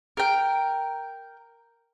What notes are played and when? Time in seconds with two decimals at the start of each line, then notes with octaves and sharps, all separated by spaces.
0.17 A#4 G5